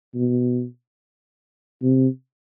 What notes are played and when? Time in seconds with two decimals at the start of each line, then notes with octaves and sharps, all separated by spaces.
0.15 B2
1.82 C3